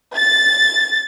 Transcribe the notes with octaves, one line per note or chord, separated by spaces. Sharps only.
A6